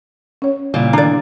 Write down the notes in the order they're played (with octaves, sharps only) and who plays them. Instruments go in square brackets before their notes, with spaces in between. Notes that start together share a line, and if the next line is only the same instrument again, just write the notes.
[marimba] C#4 C#5
[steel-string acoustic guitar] A#2 E3 G3 [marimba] C#3
[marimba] D#3 A#5 [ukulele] D4 D5